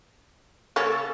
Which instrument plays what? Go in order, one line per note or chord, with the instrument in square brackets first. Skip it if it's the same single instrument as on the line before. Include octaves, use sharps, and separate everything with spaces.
[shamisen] C#3 A#3 C#4 [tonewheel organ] A4